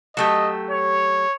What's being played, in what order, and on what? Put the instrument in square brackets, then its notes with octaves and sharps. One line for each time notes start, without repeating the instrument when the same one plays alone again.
[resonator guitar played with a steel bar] F#3 A3 G4 [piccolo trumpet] D#5
[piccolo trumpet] C#5